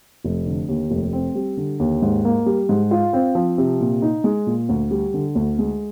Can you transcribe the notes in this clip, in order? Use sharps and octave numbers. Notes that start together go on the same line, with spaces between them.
F1
D3
D#2
F1
C4
G3
D3
D#2
G#2
A#3
G3
G#2
F4
C4
F3
C3
A#2
D#4
G#3
A#2
D2
G3
D3
D2
G#3